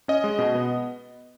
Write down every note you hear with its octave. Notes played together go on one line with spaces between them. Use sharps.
C#4 D#5
G#3
B2
B3